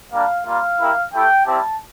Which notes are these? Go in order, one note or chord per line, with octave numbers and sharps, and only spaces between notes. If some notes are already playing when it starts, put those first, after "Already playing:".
G3 A#3 D4 F5
G3 A#3 F4 F5
A#3 E4 G4
A3 E4 G4 G5
G3 C4 E4 G4 A5